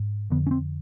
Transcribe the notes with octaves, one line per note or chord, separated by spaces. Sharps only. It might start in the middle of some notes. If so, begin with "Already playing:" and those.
Already playing: G#2
F2 D3 B3
C#4
C4